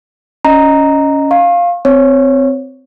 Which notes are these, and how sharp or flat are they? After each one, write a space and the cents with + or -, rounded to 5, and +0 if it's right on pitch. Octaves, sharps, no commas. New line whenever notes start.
C#4 +15 D#5 +0 A#5 +0
F5 +0 C#6 -45
C4 -15 C#5 +0